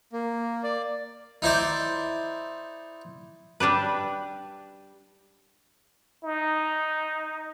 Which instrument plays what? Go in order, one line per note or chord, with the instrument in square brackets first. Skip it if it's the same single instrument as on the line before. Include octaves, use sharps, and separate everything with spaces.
[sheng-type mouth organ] A#3
D5
[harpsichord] D#4 E4 C5 D5
[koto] G3 D4 G4 B4
[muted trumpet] D#4